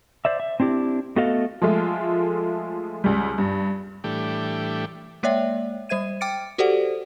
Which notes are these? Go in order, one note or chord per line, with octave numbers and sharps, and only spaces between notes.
C5 D5 E5
E5
C4 D4 E4 G4
A3 B3 F#4 A4 D#5 F5
F3 G#3 A3 F4
C#2 G3
G2
A2 E3 G3 A3 D4 G4
G#3 A#3 C#5 D5 E5 G5
G3 C5 E5 G#6 D#7
G5 D6 F6 A6 C#7 D7
F#4 G4 A4 C5 D5 F#5